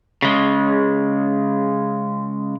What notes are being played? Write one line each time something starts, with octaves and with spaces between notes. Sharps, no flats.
C#3 G#3